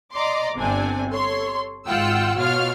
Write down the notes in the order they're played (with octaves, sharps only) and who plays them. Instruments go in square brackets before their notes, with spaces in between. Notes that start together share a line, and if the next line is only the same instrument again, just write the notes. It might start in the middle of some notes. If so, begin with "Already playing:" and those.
[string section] D5 D#5 A#5 C6 D6
G1 C3 C4 D4 G#5
A4 C#5 C6
G#1 G#2 F4 F#5 G5 E6
B2 F4 F#4 C#5 F5 F6